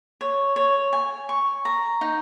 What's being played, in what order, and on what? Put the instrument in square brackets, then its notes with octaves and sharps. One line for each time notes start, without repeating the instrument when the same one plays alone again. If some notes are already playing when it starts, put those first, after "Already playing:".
[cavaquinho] C#5
C#5
G#5
C#6
A#5
D#4